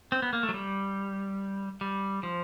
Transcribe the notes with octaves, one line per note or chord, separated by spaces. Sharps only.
C4
B3
A#3
A3
F#3
G3
G3
F3